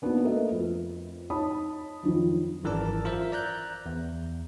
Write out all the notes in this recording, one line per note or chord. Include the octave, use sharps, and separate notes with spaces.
A#3 B3 D4 D#4 F#4 B4
A3 A#3 A4 A#4 D#5 E5
F2
D#4 C#5 A5 B5 D#6
F2 D#3 F3 F#3
G#1 F#2 E3 A#4 D5 A5
F4 A#4 C5 E5
D5 A#5 F#6 G6
E2